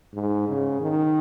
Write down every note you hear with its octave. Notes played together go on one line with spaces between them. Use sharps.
G#2
C#3
D#3